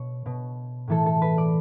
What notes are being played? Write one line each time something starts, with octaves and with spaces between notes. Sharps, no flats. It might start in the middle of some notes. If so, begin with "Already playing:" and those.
Already playing: B2 C#5
B2
A2 E3 A4
A4
B4
D5